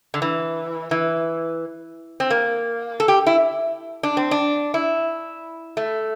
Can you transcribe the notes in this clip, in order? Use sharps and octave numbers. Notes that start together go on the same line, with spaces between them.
D3
E3
E3
C4
A#3
A4
G4
E4
D4
C4
D4
E4
A3